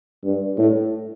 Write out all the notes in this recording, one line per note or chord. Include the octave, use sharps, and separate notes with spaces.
G2
A2